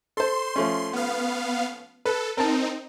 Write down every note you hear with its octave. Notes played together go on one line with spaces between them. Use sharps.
A4 C5 C6
F3 A3 C#4
B3 F5
A4 B4
C4 D#4 A#4 A5